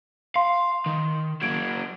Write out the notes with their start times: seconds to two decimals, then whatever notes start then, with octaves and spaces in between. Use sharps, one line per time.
0.36 F5 C6
0.86 D#3
1.42 F#3 A#3 G#6 D7